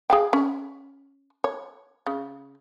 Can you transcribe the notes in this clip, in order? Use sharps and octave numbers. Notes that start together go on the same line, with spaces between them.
G#4 F5 G5
C#4
C#5
C#3